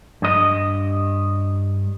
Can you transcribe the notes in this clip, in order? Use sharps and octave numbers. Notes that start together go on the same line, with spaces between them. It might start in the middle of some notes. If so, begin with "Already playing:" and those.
G2 D#5